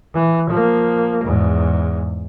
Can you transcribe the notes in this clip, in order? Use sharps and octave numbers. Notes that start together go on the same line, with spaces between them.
E3
F3 A#3
E2 G#2